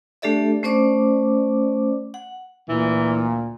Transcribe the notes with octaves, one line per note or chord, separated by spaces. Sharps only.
A3 D4 G4 A4 D5 E5
A3 C#4 C5 D5 D6
F#5
D2 A#2 E3